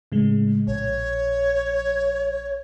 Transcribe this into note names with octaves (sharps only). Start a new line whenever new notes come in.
A2 C#3 G#3
A#1 C#5